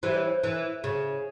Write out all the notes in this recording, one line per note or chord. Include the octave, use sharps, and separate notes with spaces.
E3 G3 C5
C#5
C5
E3
C#3